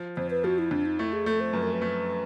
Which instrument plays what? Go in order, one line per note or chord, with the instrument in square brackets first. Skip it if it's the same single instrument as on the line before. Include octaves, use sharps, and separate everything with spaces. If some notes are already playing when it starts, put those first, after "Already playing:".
Already playing: [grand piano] F3
[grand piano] F2 [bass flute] C5
[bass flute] B4
[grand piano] F3 [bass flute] F#4
[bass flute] E4
[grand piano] F2 [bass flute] D4
[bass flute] D#4
[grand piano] A3 [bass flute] E4
[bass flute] G#4
[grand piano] A3 [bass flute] A4
[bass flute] C5
[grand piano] F#2 [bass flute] B4
[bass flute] A#4
B4
[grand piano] A3